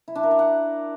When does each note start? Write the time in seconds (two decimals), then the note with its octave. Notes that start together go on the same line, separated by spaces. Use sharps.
0.08 E4
0.15 D4
0.23 A#4
0.31 D5
0.39 F#5